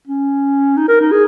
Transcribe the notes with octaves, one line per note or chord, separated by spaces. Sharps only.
C#4
D#4
A#4
D#4
G#4